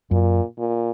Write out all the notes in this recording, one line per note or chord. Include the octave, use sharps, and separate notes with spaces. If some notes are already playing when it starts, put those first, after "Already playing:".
F#2 A#2
A#2